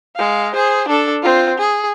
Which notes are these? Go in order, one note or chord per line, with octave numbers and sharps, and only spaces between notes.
G#3 F5
G#4 C5
D4 A4
C4 F4
G#4